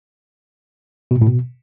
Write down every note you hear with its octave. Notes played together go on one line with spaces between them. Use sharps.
B2
A#2
A2
B2